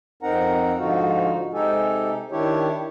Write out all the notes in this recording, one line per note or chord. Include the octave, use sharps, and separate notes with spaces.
F2 C4 D#4 A#4 F#5 A#5
G#2 D3 F3 D#4 F4 F#4
C3 G#3 D#4 G4 A4 G#5
D#3 D4 E4 G4 C#5